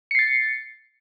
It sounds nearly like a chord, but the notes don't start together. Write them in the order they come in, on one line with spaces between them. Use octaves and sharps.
C#7 C7 A6